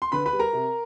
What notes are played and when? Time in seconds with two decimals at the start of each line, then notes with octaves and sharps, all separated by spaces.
0.02 C6
0.12 D3 B4 B5
0.26 B4 B5
0.33 G3
0.39 A#4 A#5
0.53 C3